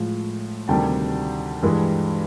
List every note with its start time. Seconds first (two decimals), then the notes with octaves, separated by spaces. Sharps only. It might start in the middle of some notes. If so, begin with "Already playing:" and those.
Already playing: A2 F3 G#3
0.68 D2 C3 D#3 G3 G5 A5
1.62 G2 E3 G#3